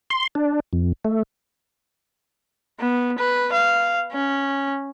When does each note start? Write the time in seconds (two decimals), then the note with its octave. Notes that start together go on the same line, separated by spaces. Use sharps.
0.10 C6
0.35 D4
0.73 F2
1.05 A3
2.80 B3
3.19 B4
3.53 F5
4.12 C#4